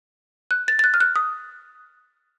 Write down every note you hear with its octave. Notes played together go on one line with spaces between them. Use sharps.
F#6
A6
A6
F#6
F6
F#6
D#6